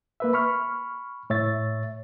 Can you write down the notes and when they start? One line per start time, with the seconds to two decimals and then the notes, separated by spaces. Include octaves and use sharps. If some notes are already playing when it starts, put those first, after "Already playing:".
0.20 A#3 B4 E5
0.33 B5 C#6 F6
1.30 A2 C#5 E5 A6